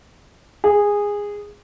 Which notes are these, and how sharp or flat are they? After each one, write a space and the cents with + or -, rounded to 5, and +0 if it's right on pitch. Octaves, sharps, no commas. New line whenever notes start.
G#4 -15